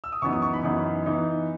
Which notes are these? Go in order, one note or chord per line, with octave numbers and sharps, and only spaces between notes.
E6
D#6
F#2 E3 B3 D#4 C#6
D#6
C#6
B5
F#2 E3 B3 D#4
E3 B3 D#4